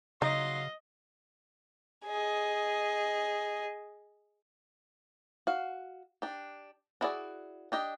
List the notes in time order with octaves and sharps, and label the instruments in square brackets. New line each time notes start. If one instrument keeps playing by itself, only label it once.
[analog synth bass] C#3 [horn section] F#3 F5 C6 [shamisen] D#4 [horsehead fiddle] D#5
[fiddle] G#4 D#5
[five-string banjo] F#4 F5
D4 G4
D4 E4 F#4 G#4 D5
D4 G4 D#5